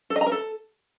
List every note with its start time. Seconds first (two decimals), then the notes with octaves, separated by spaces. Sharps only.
0.10 A4
0.16 D#5
0.21 A#5
0.26 A#4
0.32 A4